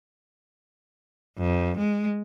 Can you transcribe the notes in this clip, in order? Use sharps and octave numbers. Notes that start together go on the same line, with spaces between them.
F2
G#3